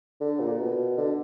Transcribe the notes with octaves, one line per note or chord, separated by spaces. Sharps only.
D3
A#2
B2
D3